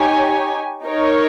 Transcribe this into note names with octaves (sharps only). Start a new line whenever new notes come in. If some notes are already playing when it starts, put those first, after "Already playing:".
Already playing: D#4 G4 C#5 G#5
D#4 A#4 C#5